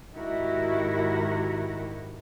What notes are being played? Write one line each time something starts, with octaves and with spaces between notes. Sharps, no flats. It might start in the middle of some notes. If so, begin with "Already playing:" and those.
G#2 D#3 E4 F#4 G4 A#4